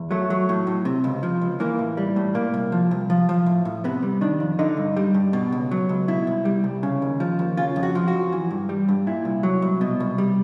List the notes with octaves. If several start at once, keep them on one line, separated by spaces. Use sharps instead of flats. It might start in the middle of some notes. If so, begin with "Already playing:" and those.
Already playing: E2
F#3 A3
F#3
A2
A2
C3
C#2
F3
C#2
E3 A#3
A2
G3
A2
A#2 A#3
C2
F3
C2
F3
F3
A2
A2
C3 B3
G3
D#3 D4
F2
D3 D#4
G2
G3
G2
B2
C#2
F#3
C#2
B2 E4
C2
G3
C2
C#3
D#2
F3
D#2
C#3 F4
F2
F#4
F3
F#4
F2
E3
G2
G3
G2
A#2 E4
C2
F#3
C2
B2
C2
G3